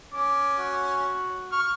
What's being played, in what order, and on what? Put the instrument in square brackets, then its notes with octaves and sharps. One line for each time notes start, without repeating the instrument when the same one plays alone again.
[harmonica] C#4 [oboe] D6
[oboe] F#4
[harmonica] C#6 F6